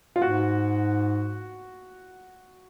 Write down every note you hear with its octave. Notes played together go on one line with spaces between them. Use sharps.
F4
G#2 F#4